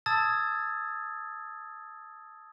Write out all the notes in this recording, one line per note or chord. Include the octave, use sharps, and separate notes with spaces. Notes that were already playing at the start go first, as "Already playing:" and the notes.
A5 D#6 E6 G#6 A6